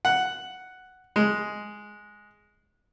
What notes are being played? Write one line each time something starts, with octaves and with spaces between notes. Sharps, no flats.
F#5
G#3